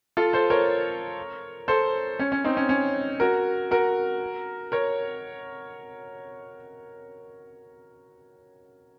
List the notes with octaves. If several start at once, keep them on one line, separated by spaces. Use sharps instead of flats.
F4 A4
A4 C5
A#4 C#5
A4 C5
C#4
C#4
C4 D#4
C#4
C#4
F#4 A#4
F#4 A#4
A#4 C#5